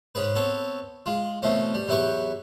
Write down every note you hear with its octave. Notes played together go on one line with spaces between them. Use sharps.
G#2 C#4 G#4 B4
B3 C4 A4 C#5
G#3 F4
B2 E3 A3 C4 C#4
G3
E2 F#3 E4 G4 B4 C#6